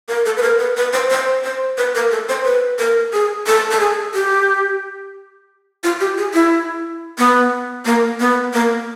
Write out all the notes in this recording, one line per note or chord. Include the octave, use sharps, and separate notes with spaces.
A#4
A4
B4
A#4
B4
B4
C5
C5
C5
B4
A#4
A4
C5
B4
A#4
G#4
A4
A4
G#4
G4
F4
G4
G#4
E4
B3
A#3
B3
A#3